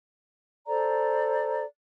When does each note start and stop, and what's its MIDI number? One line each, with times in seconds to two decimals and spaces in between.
0.67 1.64 69
0.67 1.64 72
0.67 1.64 74
0.67 1.64 82